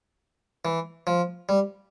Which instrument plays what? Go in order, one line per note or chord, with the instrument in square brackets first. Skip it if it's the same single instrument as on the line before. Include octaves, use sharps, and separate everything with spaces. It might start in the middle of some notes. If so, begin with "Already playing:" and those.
[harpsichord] E3
F3
G3